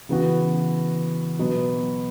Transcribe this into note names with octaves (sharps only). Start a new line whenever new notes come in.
C#3 E3 B3 F#4
B2 F#3 B3